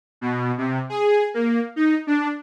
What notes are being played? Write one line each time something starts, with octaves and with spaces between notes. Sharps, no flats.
B2
C3
G#4
A#3
D#4
D4